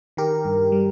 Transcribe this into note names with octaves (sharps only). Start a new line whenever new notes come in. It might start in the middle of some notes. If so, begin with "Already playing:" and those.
D#3 G4 A#4
G2
G3